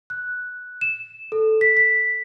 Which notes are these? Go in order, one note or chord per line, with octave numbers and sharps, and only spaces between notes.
F#6
E7
A4
B6
B6